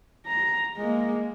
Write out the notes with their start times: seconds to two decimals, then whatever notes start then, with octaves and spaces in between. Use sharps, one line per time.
0.26 A#5
0.77 G#3 A#3